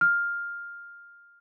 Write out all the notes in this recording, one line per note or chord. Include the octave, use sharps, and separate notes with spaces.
F6